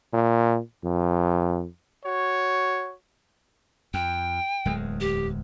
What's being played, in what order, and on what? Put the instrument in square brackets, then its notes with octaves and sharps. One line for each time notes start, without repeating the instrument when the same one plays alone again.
[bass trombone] A#2
F2
[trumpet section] F#4 C#5
[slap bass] F2 [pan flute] G5
[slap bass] D1 E2 G#3
[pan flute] G4